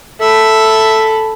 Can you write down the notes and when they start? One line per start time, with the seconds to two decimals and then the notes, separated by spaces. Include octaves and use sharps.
0.21 A4 E5 B5